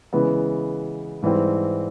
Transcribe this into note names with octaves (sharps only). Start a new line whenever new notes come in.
C#3 E3 G#3 B3
G#2 E3 G3 C4